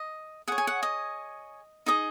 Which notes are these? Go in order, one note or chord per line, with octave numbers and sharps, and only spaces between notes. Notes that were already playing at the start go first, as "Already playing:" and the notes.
Already playing: D#5
G#4 C#5 F#5
G#5
F#5
D#5
D#4 G#4 D#5